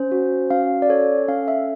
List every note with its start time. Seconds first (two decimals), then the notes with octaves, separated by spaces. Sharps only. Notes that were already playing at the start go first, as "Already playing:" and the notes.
Already playing: C#4 C5
0.12 F#4
0.50 C#4 F5
0.82 D5
0.89 A4 C#5
1.28 C#4 F5
1.48 E5